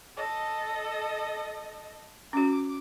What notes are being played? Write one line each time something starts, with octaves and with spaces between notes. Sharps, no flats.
A4 D#5
C#4 F#4 D6